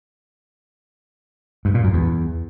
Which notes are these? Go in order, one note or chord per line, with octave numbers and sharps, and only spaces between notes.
G2
A#2
F#2
E2